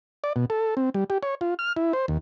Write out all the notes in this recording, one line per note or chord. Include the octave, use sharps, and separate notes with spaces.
D5
B2
A4
C4
G3
G4
C#5
F4
F6
E4
C5
D#2